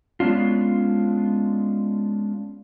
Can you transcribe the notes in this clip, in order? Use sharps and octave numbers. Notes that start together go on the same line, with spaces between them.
G#3 B3 C#4 D4 F4